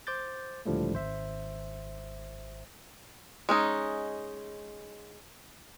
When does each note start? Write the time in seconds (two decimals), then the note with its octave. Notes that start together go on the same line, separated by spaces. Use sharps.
0.07 C5 D6 G6 A6
0.66 C#2 A2 D3 F3 G3 A3
0.93 G#1 C5 E5
3.49 G#3 C#4 D#4